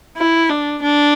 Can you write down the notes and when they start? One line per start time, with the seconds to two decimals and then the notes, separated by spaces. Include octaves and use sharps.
0.17 E4
0.50 D4
0.82 D4